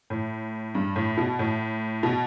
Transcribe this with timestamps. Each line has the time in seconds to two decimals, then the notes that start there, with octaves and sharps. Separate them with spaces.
0.10 A2
0.75 G2
0.96 A2
1.17 B2
1.39 A2
2.03 B2